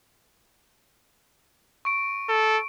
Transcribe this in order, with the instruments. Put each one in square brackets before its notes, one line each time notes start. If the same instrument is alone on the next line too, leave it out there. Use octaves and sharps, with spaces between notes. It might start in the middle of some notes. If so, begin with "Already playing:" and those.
[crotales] C#6 D7
[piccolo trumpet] A4